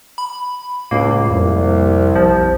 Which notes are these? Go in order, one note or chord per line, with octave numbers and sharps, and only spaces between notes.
B5
C#2 A2 A#3
C2 F2
A#1 F3